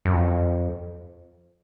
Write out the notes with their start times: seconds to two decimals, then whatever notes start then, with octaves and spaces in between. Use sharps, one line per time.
0.05 F#2
0.13 F2